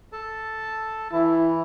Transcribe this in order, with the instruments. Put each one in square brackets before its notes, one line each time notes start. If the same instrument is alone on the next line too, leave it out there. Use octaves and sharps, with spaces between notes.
[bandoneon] A4 A5
[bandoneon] E3 [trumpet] E4